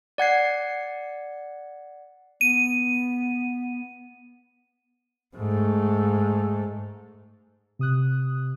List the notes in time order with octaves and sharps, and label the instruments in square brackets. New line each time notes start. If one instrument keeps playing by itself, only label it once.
[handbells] D5 F#5 G#6 C7
[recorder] B3 [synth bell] D#7
[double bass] G#2 A3
[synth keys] C3 D#6 F#6